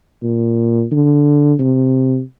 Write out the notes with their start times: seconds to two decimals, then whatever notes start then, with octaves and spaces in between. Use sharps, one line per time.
0.23 A#2
0.92 D3
1.59 C3